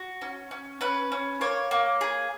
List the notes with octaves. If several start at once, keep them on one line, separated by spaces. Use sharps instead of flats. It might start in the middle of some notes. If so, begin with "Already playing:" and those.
Already playing: F#4
C#4
C#4
C#4 B4
C#4
A#3 C#5
A#3
G#4